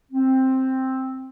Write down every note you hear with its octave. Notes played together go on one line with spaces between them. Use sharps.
C4